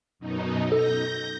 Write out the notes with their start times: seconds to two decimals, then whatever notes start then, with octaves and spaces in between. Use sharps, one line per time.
0.19 F#2 B2 D#4
0.72 A4 G6 A#6